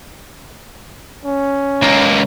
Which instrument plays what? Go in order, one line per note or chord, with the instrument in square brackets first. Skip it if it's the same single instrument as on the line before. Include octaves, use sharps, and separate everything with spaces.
[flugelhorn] C#4
[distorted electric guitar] C#2 A#3